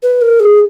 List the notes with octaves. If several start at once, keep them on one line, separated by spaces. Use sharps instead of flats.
B4
A#4
G#4